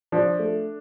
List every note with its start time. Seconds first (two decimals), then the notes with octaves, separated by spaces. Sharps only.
0.12 F3 D4
0.39 A3